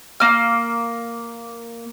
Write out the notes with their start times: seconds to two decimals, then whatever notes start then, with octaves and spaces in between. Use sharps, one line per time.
0.20 A#3 F6